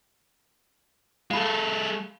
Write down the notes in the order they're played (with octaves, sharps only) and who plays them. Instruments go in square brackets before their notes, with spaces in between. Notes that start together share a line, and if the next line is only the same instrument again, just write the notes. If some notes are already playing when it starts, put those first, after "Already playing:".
[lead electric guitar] G#3 A4 [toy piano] F5 B5